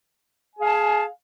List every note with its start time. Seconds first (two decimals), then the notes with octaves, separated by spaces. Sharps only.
0.54 G#5
0.58 G#4
0.61 F5
0.65 A5